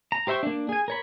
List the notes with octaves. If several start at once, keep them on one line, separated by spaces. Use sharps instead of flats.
A#5
G4 C5 E5 G5 C#6
A#3 D4
G#4 G#5
A#4 C#5 B5